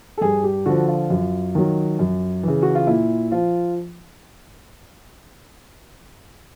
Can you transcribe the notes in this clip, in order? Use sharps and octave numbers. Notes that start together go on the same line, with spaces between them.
A4
G2 G#4
G4
D3 F3 F#4
F4
F#2
D#3 F#3
F#2
C#3 E3
F#4
F4
A#2 E4
F3 F4